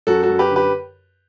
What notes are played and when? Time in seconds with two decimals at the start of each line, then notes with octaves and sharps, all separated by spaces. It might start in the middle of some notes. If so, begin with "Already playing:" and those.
0.07 F#2 F#4 A4
0.23 F#4 A4
0.29 F#2
0.39 G4 B4
0.50 D3
0.56 G4 B4